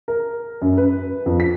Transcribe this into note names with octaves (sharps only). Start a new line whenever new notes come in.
A#4
F#2
B4
F2
B6